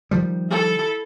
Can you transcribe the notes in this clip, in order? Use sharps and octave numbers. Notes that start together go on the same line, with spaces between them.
D#3 F3 G3
E4 A4